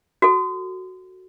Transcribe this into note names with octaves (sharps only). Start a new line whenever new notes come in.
F#4 A4